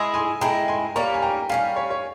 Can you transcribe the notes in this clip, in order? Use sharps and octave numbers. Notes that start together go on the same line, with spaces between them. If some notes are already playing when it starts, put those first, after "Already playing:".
Already playing: G#3 E4 G#4 C6 E6
G#5 C6
G#3 E4 G#4 G5 A#5
G#5 C6
G3 A#3 C#4 A#5 C#6
G#5
G5 A#5
G3 A#3 C#4 F5 G#5
C#5
C#5